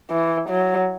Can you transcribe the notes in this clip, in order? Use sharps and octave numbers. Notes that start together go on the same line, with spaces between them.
E3
F#3